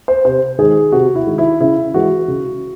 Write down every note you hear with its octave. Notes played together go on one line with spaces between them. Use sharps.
C5
C3 C5
D#3 G#3 G#4
C3 F#4
E4
D#3 G#3
E4
C#3 E4
E3 G#3 F#4
C#3